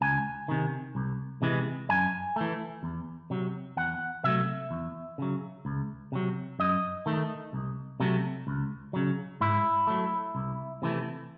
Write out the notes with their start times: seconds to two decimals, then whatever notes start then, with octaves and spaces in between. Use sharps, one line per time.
0.01 C#2 G#5
0.48 C3 D#3
0.95 C2
1.42 C3 E3 G#3
1.89 F#2 G#5
2.36 E3 A3
2.83 E2
3.30 C3 F#3
3.77 E2 F#5
4.24 C3 F#3 A3 E5
4.71 E2
5.18 C#3 F#3
5.65 C#2
6.12 C3 F#3
6.59 F#2 D#5
7.06 D#3 A3
7.53 C2
8.00 C3 F#3 A3
8.47 C#2
8.93 C#3 F#3
9.41 G#2 E4
9.87 F#3 A3
10.35 C2
10.82 C3 E3 A3